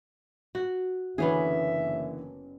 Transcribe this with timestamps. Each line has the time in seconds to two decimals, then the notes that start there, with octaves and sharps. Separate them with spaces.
0.55 F#4
1.18 F#1 D3 E3 B3 C#4 G#4 E5